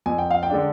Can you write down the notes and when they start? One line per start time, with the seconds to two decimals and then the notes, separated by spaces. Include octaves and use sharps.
0.06 F2 G#5
0.18 G5
0.31 F5
0.43 G5
0.50 D3 G#3 D4